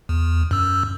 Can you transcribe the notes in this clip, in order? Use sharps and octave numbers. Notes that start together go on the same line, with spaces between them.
E2
F#2 E6